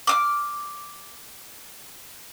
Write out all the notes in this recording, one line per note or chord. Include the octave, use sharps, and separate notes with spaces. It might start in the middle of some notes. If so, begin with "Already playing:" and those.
D6 D#6 F6